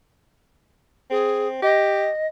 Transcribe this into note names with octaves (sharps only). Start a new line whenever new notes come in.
C4 G#4
G4 D#5